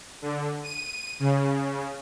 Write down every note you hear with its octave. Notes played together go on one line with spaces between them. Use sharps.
D3
D#7
C#3